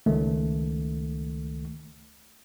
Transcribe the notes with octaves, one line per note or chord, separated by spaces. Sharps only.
C#2 D#3 A3